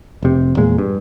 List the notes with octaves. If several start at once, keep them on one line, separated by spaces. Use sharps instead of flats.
F1 C3
E2 A#2 G#3
G2